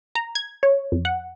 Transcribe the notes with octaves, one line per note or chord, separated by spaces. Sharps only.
A#5
G#6
C#5
F2
F#5